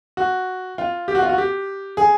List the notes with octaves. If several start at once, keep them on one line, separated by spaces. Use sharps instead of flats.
F#4
F4
G4
F#4
F4
F#4
G4
G#4